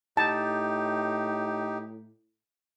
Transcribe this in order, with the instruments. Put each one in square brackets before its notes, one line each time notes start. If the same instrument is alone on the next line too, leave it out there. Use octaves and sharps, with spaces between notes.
[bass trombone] A2 [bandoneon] D#4 G4 [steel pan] A5